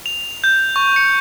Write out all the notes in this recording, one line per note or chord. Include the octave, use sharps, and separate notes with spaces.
F7
G6
C#6
C#7